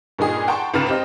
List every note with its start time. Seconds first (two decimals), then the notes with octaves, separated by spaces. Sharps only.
0.19 G2 A#2 D#4 G#4 D#6
0.48 F#5 G5 A5 A#5 C6 C#6
0.74 C#2 G#2 B4 F6 A6 E7
0.87 C4 G4 D#5